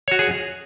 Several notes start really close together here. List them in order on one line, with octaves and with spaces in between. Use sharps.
C#5 F#4 D#5 G#4